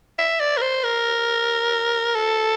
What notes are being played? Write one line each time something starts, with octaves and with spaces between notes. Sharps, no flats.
E5
D5
A#4
C5
A#4
A4